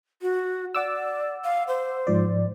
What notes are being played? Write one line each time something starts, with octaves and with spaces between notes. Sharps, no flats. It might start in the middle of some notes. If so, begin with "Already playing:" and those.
F#4
D5 F#5 D6 E6
F5
C5
G#2 F3 D5